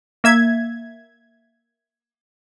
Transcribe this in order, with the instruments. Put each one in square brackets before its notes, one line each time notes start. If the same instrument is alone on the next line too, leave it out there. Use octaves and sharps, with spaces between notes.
[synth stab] A#3 E5 G#6